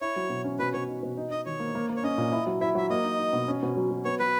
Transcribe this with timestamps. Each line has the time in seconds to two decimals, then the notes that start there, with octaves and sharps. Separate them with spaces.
0.01 E4 C#5
0.16 F#3
0.30 B2
0.44 C#4
0.59 B2 B4
0.74 B2 C#5
0.88 D#4
1.03 B2
1.17 D#4
1.31 D#4 D#5
1.46 D#3 C#5
1.60 A#3
1.75 A#3
1.89 A#3
1.96 C#5
2.03 C#4 D#5
2.18 A#2
2.32 E4
2.47 F#3
2.61 E4 E5
2.75 F#3 E5
2.90 A#3 D#5
3.04 D#4
3.19 D#4
3.33 B2
3.48 C#4
3.63 B2
3.77 F#3
3.91 F#3
4.05 B3 C#5
4.19 F#3 B4